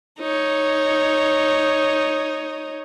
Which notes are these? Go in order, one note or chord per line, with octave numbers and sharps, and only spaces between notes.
D#4 C#5